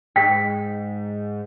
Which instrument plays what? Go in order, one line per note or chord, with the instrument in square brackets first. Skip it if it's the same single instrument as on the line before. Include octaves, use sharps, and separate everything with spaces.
[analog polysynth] G#2 [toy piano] G5 [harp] B6